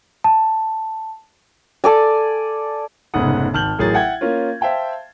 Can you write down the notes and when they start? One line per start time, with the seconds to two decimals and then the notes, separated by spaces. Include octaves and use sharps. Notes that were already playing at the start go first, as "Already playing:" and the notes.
0.24 A5
1.84 A4 D5 G#5
3.14 F1 G#2 C#3 B3 F#5 D#6
3.54 G#1 A5 F6 G6 F#7
3.79 A1 F#3 G#4 A#4 A6
3.94 E5 F#5 G5 G#6
4.21 A#3 C#4 F4
4.61 C5 E5 F5 G5 A5